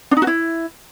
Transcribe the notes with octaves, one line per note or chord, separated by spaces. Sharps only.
D4
D#4
F#4
E4